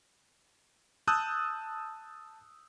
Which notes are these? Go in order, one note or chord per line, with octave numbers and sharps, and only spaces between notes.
A5 D#6 E6 F#6 G6